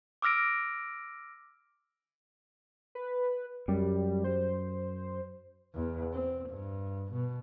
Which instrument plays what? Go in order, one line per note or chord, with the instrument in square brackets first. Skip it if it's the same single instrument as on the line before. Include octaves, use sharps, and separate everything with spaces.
[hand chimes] D6 E6 F6 A#6 D7
[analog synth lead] B4
[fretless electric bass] F#2 [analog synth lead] G3
[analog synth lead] C5
[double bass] E2
C4
G2
B2